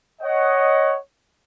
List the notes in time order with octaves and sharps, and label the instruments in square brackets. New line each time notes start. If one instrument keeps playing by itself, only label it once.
[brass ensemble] C#5 D#5 F#5